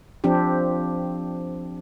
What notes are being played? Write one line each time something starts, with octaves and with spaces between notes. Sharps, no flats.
F3 C4 D4 G4